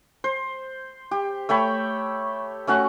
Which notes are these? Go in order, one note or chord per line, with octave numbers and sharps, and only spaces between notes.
C5
G4
A3 C#5 G5 B5
A3 C#4 F#4 F#5